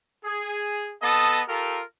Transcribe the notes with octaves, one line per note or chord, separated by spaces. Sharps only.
G#4
B3 A4 D#5 A5 D#6
F4 G4 A4 A#4